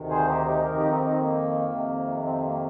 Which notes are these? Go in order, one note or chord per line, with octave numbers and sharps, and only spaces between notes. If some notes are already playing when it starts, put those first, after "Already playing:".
Already playing: D2 C3 D#3
G#4 C5
D#4 G4
D#4 G4
F2 D#3 G4 A#4
D#4 G4
C4 D#4
C4 D#4
A#3
F2 C3 D#3
C4
A#3